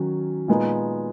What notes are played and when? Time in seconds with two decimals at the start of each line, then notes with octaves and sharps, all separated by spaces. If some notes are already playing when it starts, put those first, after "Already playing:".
Already playing: D#3 F#3 C#4
0.48 A#2 G#3 B3 D#4